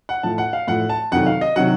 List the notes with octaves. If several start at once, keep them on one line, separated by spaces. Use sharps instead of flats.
F#5
A2 F3 A5
F#5
F5
A2 F3 F#5
A5
F2 C3 D#3 F#3 F#5
F5
D#5
C3 D#3 F#3 F#5